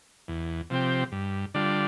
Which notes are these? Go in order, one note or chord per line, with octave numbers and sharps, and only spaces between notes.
E2
C3 F3 C4 G4
G2
D3 G3 D4 F4